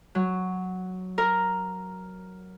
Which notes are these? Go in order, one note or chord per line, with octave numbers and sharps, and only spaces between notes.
F#3
A#4